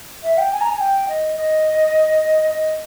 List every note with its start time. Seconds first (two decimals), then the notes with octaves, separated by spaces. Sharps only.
0.22 E5
0.37 G5
0.51 G#5
0.60 A#5
0.70 G#5
0.79 G5
1.08 D#5
1.36 D#5
2.50 D#5